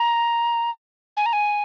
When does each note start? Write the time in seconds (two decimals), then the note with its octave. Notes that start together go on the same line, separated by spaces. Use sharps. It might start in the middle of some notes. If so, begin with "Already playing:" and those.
Already playing: A#5
1.17 G#5
1.26 A#5
1.33 G#5